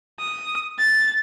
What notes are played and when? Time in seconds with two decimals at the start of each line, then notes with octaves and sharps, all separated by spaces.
0.19 D#6
0.79 A6